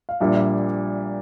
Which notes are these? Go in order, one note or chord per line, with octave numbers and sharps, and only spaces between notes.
F5
A#1 A#2 G3 E5
E5